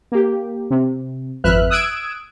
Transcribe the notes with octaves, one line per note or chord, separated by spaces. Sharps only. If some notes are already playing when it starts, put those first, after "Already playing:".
A#3 G4
C3
G#1 F2 B4 E5 F6 F#6
D#6 E6 F#6 G#6 D7 E7